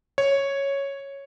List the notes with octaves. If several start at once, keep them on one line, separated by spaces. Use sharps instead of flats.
C#5